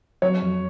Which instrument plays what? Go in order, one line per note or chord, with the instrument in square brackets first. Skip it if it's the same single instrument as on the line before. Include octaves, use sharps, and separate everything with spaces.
[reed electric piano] F#3 [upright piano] C#5
[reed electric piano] F2